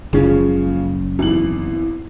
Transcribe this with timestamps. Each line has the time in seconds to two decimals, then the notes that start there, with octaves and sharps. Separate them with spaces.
0.13 F#1 C#3 F3 G#3 C#4
1.19 G#1 E2 F#7